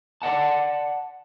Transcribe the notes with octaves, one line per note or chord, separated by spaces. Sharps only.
D5 D#5 F#5 A5